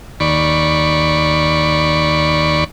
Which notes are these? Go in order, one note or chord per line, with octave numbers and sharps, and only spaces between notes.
D#2 D5 B5 C#6